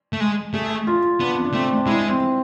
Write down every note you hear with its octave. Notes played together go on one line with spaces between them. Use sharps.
A3
G#3
A3 G#4
F4
B3 D4
D4
A3 C4
D4
G#3 E4
C4